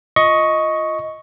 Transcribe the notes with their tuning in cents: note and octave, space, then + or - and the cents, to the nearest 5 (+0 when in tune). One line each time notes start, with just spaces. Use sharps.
F4 -5 D#5 +10 C#6 +0